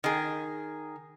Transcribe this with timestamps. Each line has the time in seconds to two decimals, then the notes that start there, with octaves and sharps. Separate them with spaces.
0.04 D#3 G#4